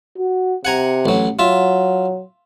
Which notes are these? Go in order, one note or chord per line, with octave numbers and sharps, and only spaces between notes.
F#4
C3 F#5 G#5 A#5
A1 F#3
F#3 F4 E5